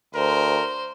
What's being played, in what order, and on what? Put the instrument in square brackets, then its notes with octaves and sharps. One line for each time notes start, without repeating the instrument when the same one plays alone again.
[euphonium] D2 [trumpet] A#4 [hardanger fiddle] C5